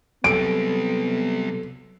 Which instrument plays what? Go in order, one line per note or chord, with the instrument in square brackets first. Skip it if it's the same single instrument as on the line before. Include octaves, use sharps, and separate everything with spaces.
[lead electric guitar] C3 G3 [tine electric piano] F#3 A4 [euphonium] B3 [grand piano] D7